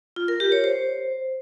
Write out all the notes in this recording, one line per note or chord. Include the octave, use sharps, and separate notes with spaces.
F4
A#4
G4
C#5
C5